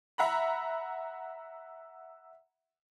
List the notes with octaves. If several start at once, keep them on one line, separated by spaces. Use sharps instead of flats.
E5 F#5 A#5 B5